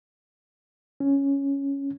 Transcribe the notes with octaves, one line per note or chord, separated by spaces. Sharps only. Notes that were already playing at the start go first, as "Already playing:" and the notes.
C#4